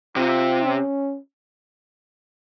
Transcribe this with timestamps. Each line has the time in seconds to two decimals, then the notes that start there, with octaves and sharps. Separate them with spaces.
0.16 C3 F4
0.67 C#4